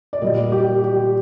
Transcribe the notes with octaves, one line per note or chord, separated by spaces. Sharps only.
D5
A#2 G3 A#3 D#5
G4
G4